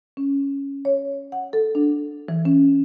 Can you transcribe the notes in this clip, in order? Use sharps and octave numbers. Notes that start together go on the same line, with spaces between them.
C#4
C#5
F#5
A4
D4
E3
C#4